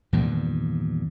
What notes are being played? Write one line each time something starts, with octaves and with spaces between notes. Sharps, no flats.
E2 G2 A#2 D#3